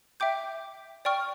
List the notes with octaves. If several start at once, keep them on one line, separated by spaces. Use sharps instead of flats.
E5 G5 D6 G6
D5 G5 C#6 F6